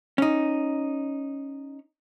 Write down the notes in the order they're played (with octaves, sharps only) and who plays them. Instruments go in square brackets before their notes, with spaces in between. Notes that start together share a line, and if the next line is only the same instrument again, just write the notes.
[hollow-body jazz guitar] C#4 D#4